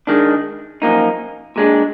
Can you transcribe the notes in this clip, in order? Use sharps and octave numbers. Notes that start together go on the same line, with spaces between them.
D#3 G#3 D4
F#2 F3 A#3 D#4
A#2 G#3 D4